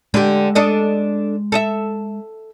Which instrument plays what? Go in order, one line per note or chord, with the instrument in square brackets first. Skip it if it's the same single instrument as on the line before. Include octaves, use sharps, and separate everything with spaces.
[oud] D3 G4 [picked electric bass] G#3
[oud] D4 A4 D#5
A4 D#5 E5